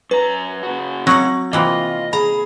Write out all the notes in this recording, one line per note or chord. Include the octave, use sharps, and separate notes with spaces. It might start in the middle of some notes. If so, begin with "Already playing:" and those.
F#2 B4 A#5
C#3 F#4
F#3 C4 F#5 C#6
C3 E3 A#3 F4 D#5
G#4 A#5 B5